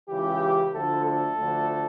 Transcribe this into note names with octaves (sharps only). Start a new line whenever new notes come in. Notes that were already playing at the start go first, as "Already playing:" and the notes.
C#2 C#3 E3 G4
D2 D3 F3 A3 A4
A4
D2 D3 F3 A3